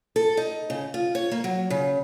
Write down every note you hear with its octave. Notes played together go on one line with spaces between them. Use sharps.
A4
D#4
C#3
F4
C#5
A#3
F#3
C#3